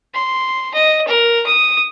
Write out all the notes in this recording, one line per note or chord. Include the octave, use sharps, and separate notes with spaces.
C6
D#5
A#4
D#6